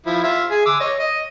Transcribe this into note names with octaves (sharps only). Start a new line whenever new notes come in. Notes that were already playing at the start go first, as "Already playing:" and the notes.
F3 E4
F4 E5
G#4 G#5
D6 E6
C#5 D#5
D#5